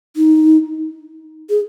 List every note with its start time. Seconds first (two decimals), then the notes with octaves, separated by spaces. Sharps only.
0.16 D#4
1.50 G#4